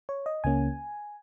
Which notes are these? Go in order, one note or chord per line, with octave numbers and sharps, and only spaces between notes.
C#5
D#5
C#2 C#3 A#3 C#4 G#5